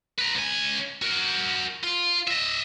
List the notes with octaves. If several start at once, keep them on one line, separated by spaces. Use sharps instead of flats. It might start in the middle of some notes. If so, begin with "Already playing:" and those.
B4 A#5
C#2 G#5
F#4 A#4
F4
D#5 E5